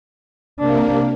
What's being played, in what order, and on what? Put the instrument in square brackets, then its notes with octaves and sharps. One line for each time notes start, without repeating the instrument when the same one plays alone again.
[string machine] C3 A#3 [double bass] D4